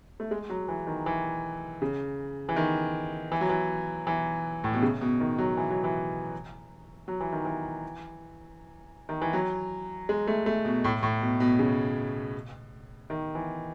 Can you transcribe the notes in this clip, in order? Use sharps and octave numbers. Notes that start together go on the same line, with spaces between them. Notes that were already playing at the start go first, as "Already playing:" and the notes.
A3
G#3
F#3
E3
D#3
E3
C#3
E3
D#3
E3
F#3
E3
E3
A2
B2
C#3
B2
D#3
F#3
E3
F#3
E3
F#3
E3
D#3
E3
D#3
E3
F#3
G#3
A3
A3
B2
A2
A2
B2
B2
C#3
D#3
E3